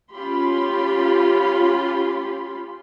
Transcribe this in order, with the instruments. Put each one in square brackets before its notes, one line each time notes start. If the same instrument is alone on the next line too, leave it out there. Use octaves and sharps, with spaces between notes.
[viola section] C#4 F4 G4 B5 C6